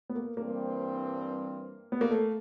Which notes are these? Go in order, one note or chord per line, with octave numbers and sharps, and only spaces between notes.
B3
A#3
G2 E3 G3 A#3 C4
B3
A#3
A3